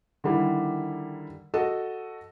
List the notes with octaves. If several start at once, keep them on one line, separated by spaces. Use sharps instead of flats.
D3 D#3 G3 E4
F#4 A4 D#5